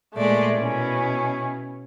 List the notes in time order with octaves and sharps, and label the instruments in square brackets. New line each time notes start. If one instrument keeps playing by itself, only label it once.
[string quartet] A#2 G#3 D5 [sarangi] A3
[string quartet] B2 E4 [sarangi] C#4